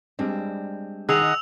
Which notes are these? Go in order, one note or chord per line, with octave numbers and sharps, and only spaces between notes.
G3 G#3 C4 D4
D#3 G#4 D#5 F#5 E6 F7